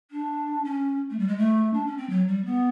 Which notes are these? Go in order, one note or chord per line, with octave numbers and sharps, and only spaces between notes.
D4
C#4
A3
G3
G#3
A3
D4
C#4
C4
F#3
G3
B3